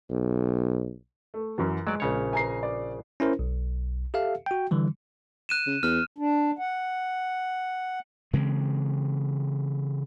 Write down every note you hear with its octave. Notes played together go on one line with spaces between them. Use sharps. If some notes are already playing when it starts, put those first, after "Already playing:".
B1
A3
F#2 E3 F#3
F#3 G#3 D5
A#1 C#3 C#5
G#5 A#5 C7
D5
C#4 E4 A#4 C5
B1
G4 A4 E5 F5
F#4 G5
D3 E3 G3
F#6 D#7 E7
C#3
E2 F6
D4
F#5
C#3 E3 G#3 C4